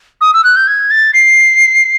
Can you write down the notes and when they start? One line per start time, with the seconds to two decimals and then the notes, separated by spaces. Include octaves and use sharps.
0.21 D#6
0.33 E6
0.44 F#6
0.56 G6
0.67 G#6
0.90 A6
1.13 C7